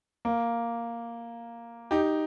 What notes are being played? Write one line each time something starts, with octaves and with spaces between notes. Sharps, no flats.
A#3
D#4 G4